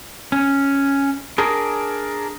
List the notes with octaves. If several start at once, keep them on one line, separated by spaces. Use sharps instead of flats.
C#4
D4 G#4 A#4